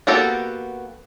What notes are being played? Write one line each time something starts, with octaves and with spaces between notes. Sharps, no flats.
A#3 B3 F#4 G4 A4